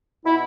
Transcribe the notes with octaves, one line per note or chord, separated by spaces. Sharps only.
B2 E4